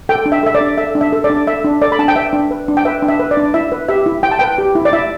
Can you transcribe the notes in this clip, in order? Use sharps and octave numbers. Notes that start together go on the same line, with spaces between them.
A4 G5
D4
E5
A4 E5
D5
D4
A4 E5
D4
E5
A4
D5
D4
A4 E5
D4
A4 D5
B5
D4 A5
G5
B4 E5
D4
B4
D4
G5
B4 E5
D4
E5
B4
D5
D4
E4 E5
B4
G4 E5
E4
E4 G5
A5
B4 G5
G4
E4
D5
E4 E5